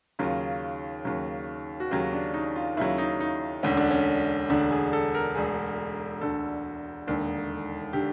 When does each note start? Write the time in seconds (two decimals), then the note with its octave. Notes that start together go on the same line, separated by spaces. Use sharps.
0.19 D#2 C#3 F#3 F4
1.05 D#2 C#3 F#3
1.80 F#4
1.91 D#2 C#3 F#3 G4
2.13 D4
2.34 D#4
2.56 F4
2.77 D#2 C#3 F#3 E4
2.98 D#4
3.20 D#4
3.63 E1 D2 D3 C#4
3.77 D4
3.91 C#4
4.50 E1 D2 D3 D4
4.71 G#4
4.93 A4
5.14 A#4
5.35 E1 D2 D3 G#4
6.21 E1 D2 D3 A4
7.08 E1 D#2 D3
7.93 D3 G4